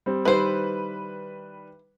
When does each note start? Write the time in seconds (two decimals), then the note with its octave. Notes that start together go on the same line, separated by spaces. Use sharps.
0.06 G3 C4
0.25 D#3 G3 E4 B4 C5